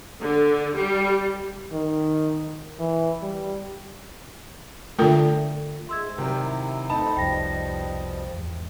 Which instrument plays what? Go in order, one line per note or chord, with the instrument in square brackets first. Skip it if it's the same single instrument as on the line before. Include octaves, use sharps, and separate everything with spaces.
[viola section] D3
G3
[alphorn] D#3
E3
G3
[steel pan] D3 A3 [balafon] F4 A#4 G5
[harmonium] G#2 G#3 E5 [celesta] C6 E6 G#6
[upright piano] C3 D#3 F#3 [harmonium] G3 A#4 G5
[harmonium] E4
[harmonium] F2 A3 C4 [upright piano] D#4 D#5 A5 [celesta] B5
[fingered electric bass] C2 F2 [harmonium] B2 F3 G3 [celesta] G5 A#6
[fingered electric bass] E2 G#2